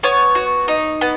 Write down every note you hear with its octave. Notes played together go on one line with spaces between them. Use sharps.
B3 C#5
F#4
D#4
B3